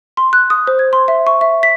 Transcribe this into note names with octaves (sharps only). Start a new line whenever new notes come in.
C6
F#6
D#6
C5
G#6
C6
E5
C#6
E5
B6